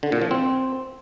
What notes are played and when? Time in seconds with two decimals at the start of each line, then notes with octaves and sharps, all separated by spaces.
0.03 D3
0.12 A#2
0.22 F3
0.31 C4